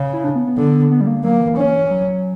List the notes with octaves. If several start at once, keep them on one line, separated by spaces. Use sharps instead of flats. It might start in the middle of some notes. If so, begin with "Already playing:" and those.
Already playing: C#3
E4
D4
B3
B3
D3
B3
G3
A#3
F#3 A#3
E3
C#4
F#3